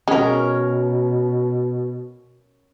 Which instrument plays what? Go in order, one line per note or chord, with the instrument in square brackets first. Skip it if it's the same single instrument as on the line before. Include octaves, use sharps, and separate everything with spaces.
[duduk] B2 [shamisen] G#3 [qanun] C#4 A#4